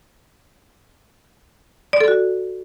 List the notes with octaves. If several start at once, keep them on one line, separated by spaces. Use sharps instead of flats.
D5
A4
F#4